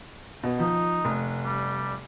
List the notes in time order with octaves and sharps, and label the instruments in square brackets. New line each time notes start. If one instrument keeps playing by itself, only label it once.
[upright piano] B2
[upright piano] F3 [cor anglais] D#4
[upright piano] F1
[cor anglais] G3